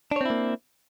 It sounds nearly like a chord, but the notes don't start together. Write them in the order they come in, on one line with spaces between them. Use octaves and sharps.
D4 C#5 C4 E4 A#3